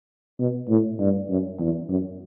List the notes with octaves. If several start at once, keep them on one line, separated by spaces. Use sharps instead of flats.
B2
A2
G2
F#2
E2
F#2